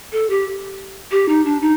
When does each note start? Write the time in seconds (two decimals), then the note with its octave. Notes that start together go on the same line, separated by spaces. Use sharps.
0.12 A4
0.30 G4
1.11 G4
1.29 D#4
1.45 D4
1.61 D#4